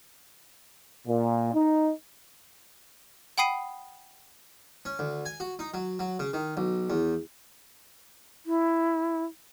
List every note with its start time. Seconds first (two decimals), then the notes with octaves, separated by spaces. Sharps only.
1.07 A#2
1.53 D#4
3.38 F#5 G5 B5 D#6 C7 D#7
4.85 C#4
4.99 D2
5.25 G#5
5.40 F#4
5.59 D#4
5.74 F#3
5.99 F#3
6.19 C#3
6.33 D#3
6.57 B1
6.90 E2
8.46 E4